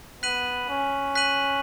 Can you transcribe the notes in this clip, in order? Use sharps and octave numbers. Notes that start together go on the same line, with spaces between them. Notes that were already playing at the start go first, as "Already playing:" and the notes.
B3 F#6 B6 D#7 F#7
C#4
F#6 B6 D#7 F#7